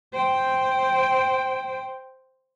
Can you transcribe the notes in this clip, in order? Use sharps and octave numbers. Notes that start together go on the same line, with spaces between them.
C5 G5